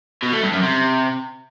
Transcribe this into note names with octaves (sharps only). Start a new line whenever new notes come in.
B2
A3
G2
F#2
C3